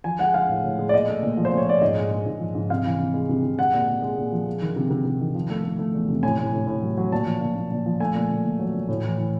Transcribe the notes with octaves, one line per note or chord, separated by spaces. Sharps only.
F3 G#5
G#3 F#5
G#3 F5
A2
A2
G#3
D5
A#2 D#5
A3
A#2
F3
C5
A#2
C#5
A#2 D5
G#2 D#5
G#3
G#3
G#2
F3
G#2
C3 F5
E3
C3
G#3
C3
C3
G#3 F#5
A#2
G#3
G#3
A#2
F3
G#3
D#3
C3
C3
C3
D#3
F3
A3
A3
A3
E2
C3
A2 G#5
A2
A2
A2
F#3
F#3
A#2 A5
F3
A#2
A#2
A#2
F3
A3 G#5
A#2
A#2
A#2
F#3
A#2
A2
E3
E3